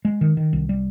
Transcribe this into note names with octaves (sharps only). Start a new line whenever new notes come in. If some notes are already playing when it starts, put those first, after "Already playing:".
G#3
D#3
D#3
C2
G3